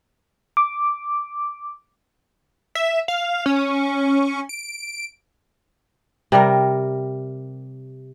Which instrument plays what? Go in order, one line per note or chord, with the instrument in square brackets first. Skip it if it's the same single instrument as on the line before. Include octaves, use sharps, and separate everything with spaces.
[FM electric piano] D6
[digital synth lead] E5
F5
C#4
D7
[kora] C3 G3 A#4